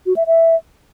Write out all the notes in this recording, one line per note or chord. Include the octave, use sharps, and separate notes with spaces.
F#4
E5
E5